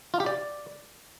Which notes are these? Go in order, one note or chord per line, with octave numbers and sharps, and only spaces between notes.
F4
G4
D5